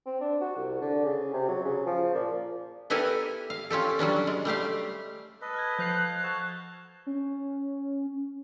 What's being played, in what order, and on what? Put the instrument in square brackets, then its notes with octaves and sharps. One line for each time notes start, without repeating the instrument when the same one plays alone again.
[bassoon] C4
D4
F#4
C2
D3
C#3
C3
F#3
C#3
F3
A#2
[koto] B3 E4 G4 A4 A#4 G#5
F5
C#4 F4 G4 A4
F#3 G3 C#4 D4
G#3
G3 A3 G4 F5
[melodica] A4 B4 D#5
[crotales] F6 F#6 G#6
[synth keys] F3 F#6 C7 [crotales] G6 F7
[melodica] F#4 A4 A5
[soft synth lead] C#4